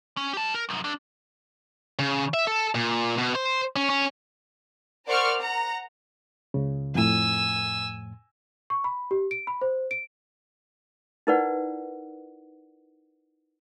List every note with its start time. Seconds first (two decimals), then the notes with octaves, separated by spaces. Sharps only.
0.17 C#4
0.33 G4 A5
0.54 A#4
0.69 C2 F#2
0.84 G3 D4
1.99 C#3
2.34 E5
2.47 A4
2.75 A#2
3.18 B2
3.35 C5
3.76 C#4
3.90 C#4
5.07 A#4 C5 D5 F#5 C#6 F6
5.38 F#5 A#5
6.54 C#2 C#3
6.95 F2 A2 G#5 E6
8.70 C#6
8.84 B5
9.11 G4
9.31 D7
9.47 B5
9.61 C5
9.91 D7
11.27 D#4 E4 A#4 B4 D5 F#5